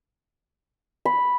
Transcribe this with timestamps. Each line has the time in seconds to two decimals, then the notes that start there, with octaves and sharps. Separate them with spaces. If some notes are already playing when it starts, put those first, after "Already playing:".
1.05 B5